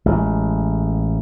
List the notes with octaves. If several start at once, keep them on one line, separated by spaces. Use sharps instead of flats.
A1 G#3